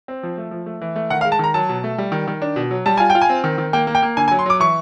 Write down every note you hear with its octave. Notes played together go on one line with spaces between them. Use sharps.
C4
F3
A3
F3
A3
E3
A3
D#3 F#5
F5
G#3
A5
D#3 A#5
F#3 A5
B2
A3
G3
D#3
D#3
D4
B2
F#3
G3 A5
F4 G#5
G5
F4
G#5
C4
D#3
D#3
A#3 G5
A#3
G5
A#3
D3 G#5
G#5
F#3
C6
F#3 D6
E3 C#6